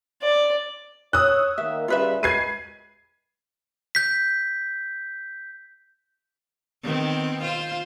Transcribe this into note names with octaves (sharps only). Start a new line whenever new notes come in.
D5
C#5 D#6 E6 F#6
D#3 A#3 E5
C#3 G3 F4 B4 E5
G#3 B4 G#6 C7 D#7
G6 B6
D#3 B3 C4
F4 C5